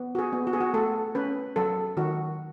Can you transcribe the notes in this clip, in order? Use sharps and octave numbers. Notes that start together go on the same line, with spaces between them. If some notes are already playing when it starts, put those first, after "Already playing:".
Already playing: B3
F#4
G#4
B3
F#4
G#4
F#4
A3 A4
C#4 B4
F#3 A4
D#3 F#4